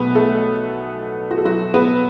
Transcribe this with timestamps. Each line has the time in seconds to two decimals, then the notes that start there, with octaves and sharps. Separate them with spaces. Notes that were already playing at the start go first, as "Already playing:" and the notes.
Already playing: B1 B2 A3 B3 B4
0.15 A3 A4
1.31 F#4
1.38 A4
1.45 F#3 F#4
1.74 B3 B4